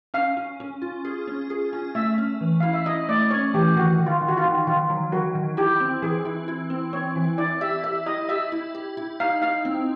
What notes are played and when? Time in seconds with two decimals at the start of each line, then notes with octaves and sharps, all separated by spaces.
0.14 C#4 F5
0.37 C#4
0.60 C#4
0.82 F4
1.05 G#4
1.27 C#4
1.50 G#4
1.73 C#4
1.95 A3 E5
2.18 C#4
2.41 E3
2.60 E4 F5
2.73 E5
2.86 E4 D#5
3.09 A3 D5
3.31 C#4 C#5
3.54 E3 G4
3.76 D#3 F#4
3.99 D#3
4.06 F4
4.21 D#3
4.28 F#4
4.37 F4
4.45 D#3
4.67 D#3 F4
4.90 F#3
5.12 D#3 F#4
5.35 D#3
5.57 E4 G4
5.80 C4
6.02 E3 G#4
6.25 E4
6.48 E4
6.70 C4
6.93 C4 C#5
7.16 E3
7.38 E4 D5
7.61 G4 E5
7.84 G4 E5
8.06 E4 D#5
8.29 G4 E5
8.52 E4
8.75 G4
8.97 E4
9.20 D#4 F5
9.42 D#4 F5
9.65 C4